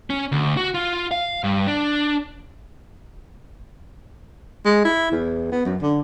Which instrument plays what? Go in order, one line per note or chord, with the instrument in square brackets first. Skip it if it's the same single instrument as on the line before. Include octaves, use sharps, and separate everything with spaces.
[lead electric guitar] C#4
D2
F#4
F4
F5
G2
D4
[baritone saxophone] G#3
E4
E2
B3
F#2
D3